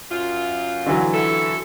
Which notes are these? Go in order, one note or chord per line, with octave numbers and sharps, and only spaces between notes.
F#2 F4
D3 E3 F#3
E4 A4